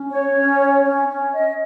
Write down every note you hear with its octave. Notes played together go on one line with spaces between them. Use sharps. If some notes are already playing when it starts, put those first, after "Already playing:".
Already playing: C#4
C#5
C#4
C#5
C#4
C#4
D#5